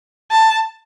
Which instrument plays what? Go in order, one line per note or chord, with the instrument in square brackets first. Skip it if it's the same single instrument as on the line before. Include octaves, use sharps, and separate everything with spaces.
[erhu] A5